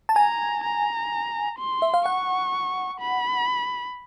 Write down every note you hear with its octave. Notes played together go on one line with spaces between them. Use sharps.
A5
G#5 A#5
A#5
C6
E5
F5
F#5 C#6
B5